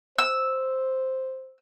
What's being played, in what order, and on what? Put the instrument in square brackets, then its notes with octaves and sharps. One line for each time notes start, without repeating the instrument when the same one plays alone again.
[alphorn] C5 [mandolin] E6